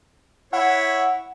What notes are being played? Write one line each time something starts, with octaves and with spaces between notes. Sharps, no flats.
E4 C#5 F#5